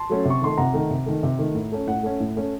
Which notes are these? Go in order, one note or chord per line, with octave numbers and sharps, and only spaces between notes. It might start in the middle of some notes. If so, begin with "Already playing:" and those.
Already playing: A5 C6
F#3 A3 C#4
C3 C#6
D#3 A3 C6
C3 F#5 A#5
D#3 A3
C3
D#3 A3
C3
D#3 A3
A2
A3 C#4
A2 F#5
A3 C#4
A2
A3 C#4